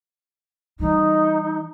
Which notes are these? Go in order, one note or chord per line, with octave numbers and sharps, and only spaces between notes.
E3 G3 D#4